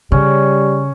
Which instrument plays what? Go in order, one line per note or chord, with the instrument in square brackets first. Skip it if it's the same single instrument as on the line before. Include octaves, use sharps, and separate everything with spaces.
[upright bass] C#3 [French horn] G3 [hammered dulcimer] C#4